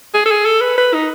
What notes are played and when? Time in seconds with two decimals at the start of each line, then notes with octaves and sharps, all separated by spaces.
0.14 G#4
0.26 A4
0.31 G#4
0.46 A4
0.61 B4
0.78 B4
0.94 D#4